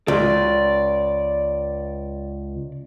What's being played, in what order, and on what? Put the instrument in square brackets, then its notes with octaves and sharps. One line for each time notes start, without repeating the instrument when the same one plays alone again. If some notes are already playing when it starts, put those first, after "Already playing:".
[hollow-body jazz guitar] C#2 [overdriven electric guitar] D5